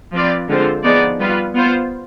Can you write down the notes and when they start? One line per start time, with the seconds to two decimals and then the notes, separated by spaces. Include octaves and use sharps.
0.13 F3 C4 F4 B4 D5
0.49 D3 G#3 C4 F4 C5
0.84 F3 B3 D#4 G#4 D5
1.20 G3 B3 F4 B4
1.55 B3 F4 C5